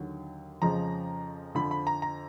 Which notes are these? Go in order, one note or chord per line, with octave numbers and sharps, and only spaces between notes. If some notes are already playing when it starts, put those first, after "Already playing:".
Already playing: D#2 D3 F#3
F2 C#3 F3 G#3 A#5
F2 D3 F3 B5
B5
A#5
A#5